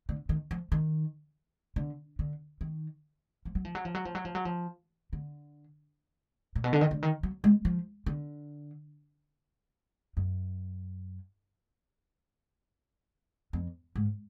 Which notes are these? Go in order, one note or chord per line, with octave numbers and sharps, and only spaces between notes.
D3
D#3
F3
D#3
D3
D3
D#3
F3
F#3
F3
F#3
F3
F#3
F3
F#3
F3
F#3
F3
D3
A#2
B2
D3
D#3
D3
D#3
F#3
G#3
F3
D3
F#2
F2
G#2